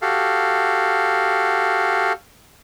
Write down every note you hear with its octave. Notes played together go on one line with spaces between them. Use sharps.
F#4 G4 A4 F5